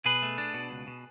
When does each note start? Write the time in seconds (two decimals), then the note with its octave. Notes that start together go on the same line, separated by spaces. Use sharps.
0.05 B2 G#4 B4
0.22 A3
0.38 D4
0.54 B2
0.71 C#2
0.87 B2